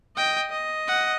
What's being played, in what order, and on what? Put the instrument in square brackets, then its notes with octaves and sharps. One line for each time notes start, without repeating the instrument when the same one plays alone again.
[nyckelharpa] D#5 [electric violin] G5
[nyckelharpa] D#5
[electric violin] F#5